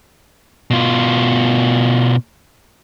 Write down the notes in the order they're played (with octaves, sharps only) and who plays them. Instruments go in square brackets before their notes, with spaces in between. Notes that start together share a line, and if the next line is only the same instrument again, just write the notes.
[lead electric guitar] B2 F4